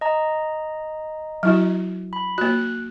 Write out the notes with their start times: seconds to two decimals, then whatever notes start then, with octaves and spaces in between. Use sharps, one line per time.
0.01 D#5 A#5
1.43 F#3 E4 F#4
2.13 B5
2.38 A#3 F#4 F#6